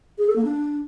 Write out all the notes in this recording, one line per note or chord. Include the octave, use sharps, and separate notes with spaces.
G#4
A4
A#3
D4